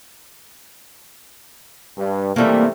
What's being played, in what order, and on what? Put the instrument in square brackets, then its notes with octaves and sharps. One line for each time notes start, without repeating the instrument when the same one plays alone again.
[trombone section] G2
[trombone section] C3 E3 A3 [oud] G3 A#3